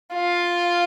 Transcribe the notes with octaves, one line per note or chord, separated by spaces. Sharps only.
F4